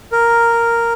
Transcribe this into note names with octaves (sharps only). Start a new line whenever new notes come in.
A#4